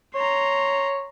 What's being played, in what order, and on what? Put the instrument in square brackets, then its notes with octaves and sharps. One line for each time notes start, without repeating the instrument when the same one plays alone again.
[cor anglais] C#5 [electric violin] A#5 C6